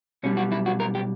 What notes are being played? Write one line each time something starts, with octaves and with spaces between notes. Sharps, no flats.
B1 B2 G3 C#4
F#4
E4
F#4
A#4
G4